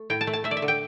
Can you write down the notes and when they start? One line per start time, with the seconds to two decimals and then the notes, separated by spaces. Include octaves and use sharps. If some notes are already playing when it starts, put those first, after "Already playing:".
Already playing: A3
0.10 A2 G5
0.21 A5
0.27 A3
0.33 A5
0.44 A3 E5
0.51 D5
0.57 E5
0.62 D3
0.68 G5